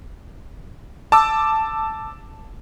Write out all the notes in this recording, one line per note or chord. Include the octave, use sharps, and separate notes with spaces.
A5 D6 E6